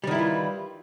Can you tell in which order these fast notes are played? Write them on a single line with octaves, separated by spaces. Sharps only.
G3 D#3 E4 E3 F4